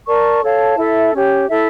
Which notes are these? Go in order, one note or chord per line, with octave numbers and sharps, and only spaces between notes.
A#4 D5 A5 C#6
A4 C#5 F5 A5
E4 A4 E5
C#4 G4 C#5
E4 A4 E5